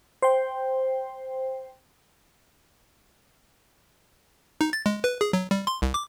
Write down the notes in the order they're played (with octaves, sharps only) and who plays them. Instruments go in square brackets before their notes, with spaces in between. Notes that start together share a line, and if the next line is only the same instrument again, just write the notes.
[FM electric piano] C5 G5
[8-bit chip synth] D#4
A6
G#3
B4
G#4
F#3
G3
C6
C2
D6